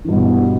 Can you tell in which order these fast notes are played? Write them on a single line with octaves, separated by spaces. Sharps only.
E3 G2 B2